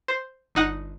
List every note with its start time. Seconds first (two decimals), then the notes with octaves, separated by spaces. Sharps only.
0.08 C5
0.55 G1 D#4 F#5